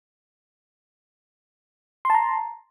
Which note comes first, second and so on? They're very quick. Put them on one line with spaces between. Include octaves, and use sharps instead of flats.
C6 A5 A#5